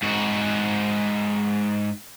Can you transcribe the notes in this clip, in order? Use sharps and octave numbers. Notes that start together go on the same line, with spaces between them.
G#2 F#4